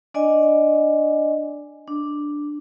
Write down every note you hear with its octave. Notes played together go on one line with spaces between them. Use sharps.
D4 D5 D#5 G#5
D4